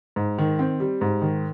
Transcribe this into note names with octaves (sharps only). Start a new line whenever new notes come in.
G#2
D#3
C4
G3
G#2
D#3